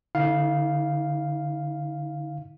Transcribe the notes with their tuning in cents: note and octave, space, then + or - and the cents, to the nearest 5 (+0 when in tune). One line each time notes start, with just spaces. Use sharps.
D3 +0 E4 -40 F5 +0